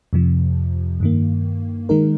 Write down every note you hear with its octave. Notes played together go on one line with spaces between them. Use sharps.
F2 C3 F3
G2 D#3 A#3
D#3 G#3 D#4 A#4